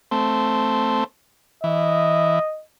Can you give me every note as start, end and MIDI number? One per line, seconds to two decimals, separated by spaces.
0.11 1.04 57
0.11 1.04 60
1.64 2.39 52
1.64 2.62 75